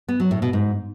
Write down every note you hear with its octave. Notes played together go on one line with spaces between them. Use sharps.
B3
F#3
A2
B2
G#2